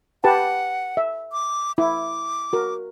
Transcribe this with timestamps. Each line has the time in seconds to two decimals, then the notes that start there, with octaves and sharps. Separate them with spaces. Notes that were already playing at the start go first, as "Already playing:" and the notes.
0.24 G4 B4 F#5 A5
0.97 E5
1.32 D6
1.78 E4 D6
2.53 F#4 A#4